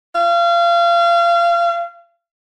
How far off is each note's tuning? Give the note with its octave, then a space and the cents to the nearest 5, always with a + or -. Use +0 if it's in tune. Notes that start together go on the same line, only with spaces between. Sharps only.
F5 -30